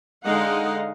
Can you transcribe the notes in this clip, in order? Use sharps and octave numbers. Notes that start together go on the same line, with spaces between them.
D3 G#3 D#4 D#5 F5 F#5